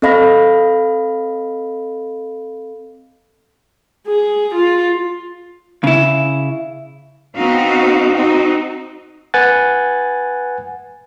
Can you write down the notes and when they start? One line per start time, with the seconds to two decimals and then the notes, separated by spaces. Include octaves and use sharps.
0.02 C4 A4 D#5 F5 B5 A#6
4.07 G#4
4.55 F4
5.84 C#3 E4
7.35 B3 C4 D#4 F#4 F5
8.12 C4 D#4 F#4
9.34 B4 F#5 G#5 F#6 A6